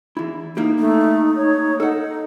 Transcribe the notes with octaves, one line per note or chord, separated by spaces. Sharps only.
E2 E4
A#3 D#4 E4 G4
A3 D#4
C#5
D#4 A4 F#5